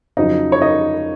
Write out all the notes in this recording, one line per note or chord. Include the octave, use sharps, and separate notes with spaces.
F2 C#3 F#3 D#4 D#5
C#5
D#4 D#5